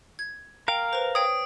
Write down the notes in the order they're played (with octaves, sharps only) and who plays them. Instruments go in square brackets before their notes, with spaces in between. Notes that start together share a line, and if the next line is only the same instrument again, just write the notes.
[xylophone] G#6
[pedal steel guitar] A#4 F5 [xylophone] G5
[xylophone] B4 C5
[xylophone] C#5 G5 [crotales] D#6 D7